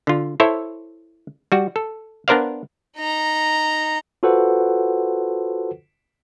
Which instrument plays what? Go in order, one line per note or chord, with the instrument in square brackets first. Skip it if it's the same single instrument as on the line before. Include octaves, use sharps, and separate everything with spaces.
[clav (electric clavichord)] D3 F4
E4 A4 C5 C#5 E5
G3 F#4
A4
B3 D4 A#4 C5 D5 F5
[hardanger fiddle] D#4 A#5
[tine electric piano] F4 F#4 A4 B4 C5 F#5